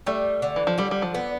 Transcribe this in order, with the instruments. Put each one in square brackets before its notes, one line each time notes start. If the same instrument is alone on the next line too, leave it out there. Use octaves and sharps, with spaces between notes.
[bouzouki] G3 [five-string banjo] A3
[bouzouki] D3
[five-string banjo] E3
F3
[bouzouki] D3 [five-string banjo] G3
[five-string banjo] G3
F3
[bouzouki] B3